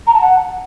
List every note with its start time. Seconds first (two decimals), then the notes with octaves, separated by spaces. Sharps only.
0.07 A#5
0.14 A5
0.21 F#5